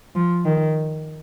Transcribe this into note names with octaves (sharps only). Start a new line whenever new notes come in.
F3
D#3